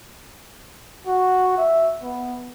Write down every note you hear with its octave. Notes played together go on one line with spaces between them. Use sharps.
F#4
E5
B3